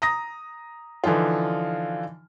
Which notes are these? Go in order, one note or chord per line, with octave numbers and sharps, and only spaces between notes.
A#5 D#6 A#6
D3 E3 F3 D#4 F4